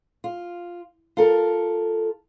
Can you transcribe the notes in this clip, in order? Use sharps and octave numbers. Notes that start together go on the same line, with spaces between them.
F4
F4 A4 A#4